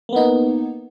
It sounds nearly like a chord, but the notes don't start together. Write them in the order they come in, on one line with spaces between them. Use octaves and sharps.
A#3 B3 D#4